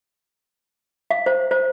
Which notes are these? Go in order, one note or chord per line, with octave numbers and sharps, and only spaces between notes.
F5
C5
C5